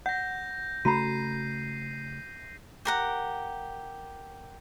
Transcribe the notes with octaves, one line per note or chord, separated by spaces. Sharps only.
F#5 G6 A#6
C#3 A3 F#4 A#5 B5 C7 D#7
G4 A#4 F#5